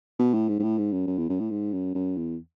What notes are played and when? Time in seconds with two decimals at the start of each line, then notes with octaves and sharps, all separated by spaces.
0.19 B2
0.34 A2
0.48 G#2
0.59 G#2
0.63 A2
0.78 G#2
0.92 F#2
1.07 F#2
1.18 E2
1.29 F#2
1.40 A2
1.50 G#2
1.73 F#2
1.95 F#2
2.16 E2